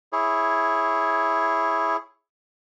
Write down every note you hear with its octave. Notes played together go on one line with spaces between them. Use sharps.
E4 G#4 C#5